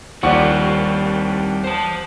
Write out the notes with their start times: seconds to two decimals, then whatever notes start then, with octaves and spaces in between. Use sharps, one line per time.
0.23 D#2 F3 G3 C4 D5 F#5 C#6
1.64 C5 A5